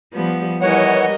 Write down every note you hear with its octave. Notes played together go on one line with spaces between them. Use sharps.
F3 G3 B3
E3 G3 A#4 C#5 D#5 F#5